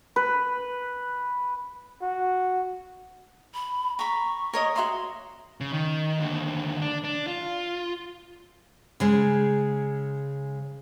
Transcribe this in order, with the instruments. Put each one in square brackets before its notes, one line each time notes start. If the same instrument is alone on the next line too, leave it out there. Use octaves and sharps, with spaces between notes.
[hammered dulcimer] B4
[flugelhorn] F#4
[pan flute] B5
[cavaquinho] A#5 B5 [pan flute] C#6
[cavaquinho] A#4 C#5 D#5
[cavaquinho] F#4 E5 C6 [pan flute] A#5
[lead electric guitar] C#3
D#3
D#2 D3
D4
D4
F4
[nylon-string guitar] C#3 G#3